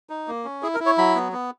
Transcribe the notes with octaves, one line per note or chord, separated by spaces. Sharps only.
D#4
A#3
C#4
E4 G#4
A#4
E4
C#5
F#3 B5
B3
B3